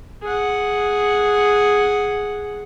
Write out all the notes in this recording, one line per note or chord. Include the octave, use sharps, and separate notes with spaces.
G#4 F#5